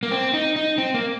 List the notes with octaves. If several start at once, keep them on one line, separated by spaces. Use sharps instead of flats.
A#3
C4
D#4
D#4
C4
A#3